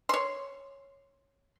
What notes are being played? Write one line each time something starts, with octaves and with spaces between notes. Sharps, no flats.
C#5 C6